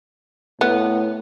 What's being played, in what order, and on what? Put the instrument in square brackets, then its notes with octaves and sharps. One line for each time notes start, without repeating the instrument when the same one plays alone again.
[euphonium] A2 [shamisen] B3